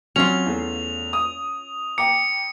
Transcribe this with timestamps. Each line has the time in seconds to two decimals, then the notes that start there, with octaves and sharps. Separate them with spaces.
0.16 F#3 C4 C#4 F4 F7
0.46 E2 A3
1.13 D#6
1.98 G5 A#5 D6 C#7